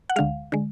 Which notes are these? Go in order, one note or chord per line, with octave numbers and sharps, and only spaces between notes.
F#5
D2 D3 G#3 F5
D3 G#3